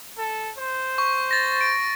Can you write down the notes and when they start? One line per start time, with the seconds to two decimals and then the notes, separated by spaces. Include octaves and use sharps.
0.18 A4
0.58 C5
0.98 C#6
1.31 A6 A#6
1.61 D7